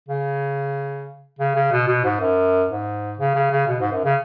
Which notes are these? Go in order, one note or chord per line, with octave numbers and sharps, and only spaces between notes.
C#3
C#3
C#3
B2
B2
G#2
F#2
G#2
C#3
C#3
C#3
B2
G#2
F#2
C#3